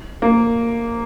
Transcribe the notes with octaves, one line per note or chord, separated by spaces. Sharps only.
A#3